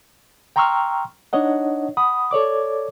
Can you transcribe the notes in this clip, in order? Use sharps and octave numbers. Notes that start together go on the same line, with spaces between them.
G5 A#5 C6 C#6 E6 F6
D4 D#4 C#5 D#5 F#5
F#5 B5 D#6
A4 C#5 D5 D6